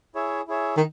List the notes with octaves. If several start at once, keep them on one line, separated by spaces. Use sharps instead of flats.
E4 G#4 C#5 E5
E4 G#4 C#5 E5
D#3